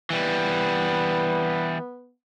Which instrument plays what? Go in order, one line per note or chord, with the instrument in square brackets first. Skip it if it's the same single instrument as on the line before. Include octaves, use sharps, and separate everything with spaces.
[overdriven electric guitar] E3 G3 [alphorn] B3